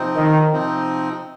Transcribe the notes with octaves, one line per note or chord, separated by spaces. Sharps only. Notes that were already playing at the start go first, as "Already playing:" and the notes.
Already playing: C3 F3 C4 D#4
D#3
C3 F3 C4 D#4